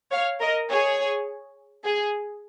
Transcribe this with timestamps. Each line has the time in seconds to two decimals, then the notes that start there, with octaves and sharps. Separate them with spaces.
0.12 C#5 F5
0.40 A#4 D#5
0.70 G#4 C#5
1.85 G#4